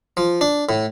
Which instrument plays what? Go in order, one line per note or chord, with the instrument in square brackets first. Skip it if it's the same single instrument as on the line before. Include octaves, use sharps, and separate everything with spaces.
[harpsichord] F3
D4
A2